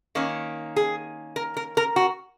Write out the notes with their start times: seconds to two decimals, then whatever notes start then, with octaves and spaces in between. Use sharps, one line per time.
0.15 D#3 A#3 C#4
0.76 G#4
1.36 A#4
1.57 A#4
1.77 A#4
1.96 F#4